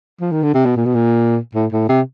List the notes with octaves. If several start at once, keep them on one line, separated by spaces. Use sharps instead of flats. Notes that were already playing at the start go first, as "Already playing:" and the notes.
F3
D#3
D3
C3
B2
A#2
B2
A#2
A2
A2
C3